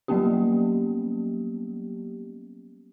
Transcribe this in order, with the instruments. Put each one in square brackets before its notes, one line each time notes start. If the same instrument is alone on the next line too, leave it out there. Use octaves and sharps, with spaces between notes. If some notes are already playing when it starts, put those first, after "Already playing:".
[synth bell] F#3 G3 A#3 B3 C#4 G4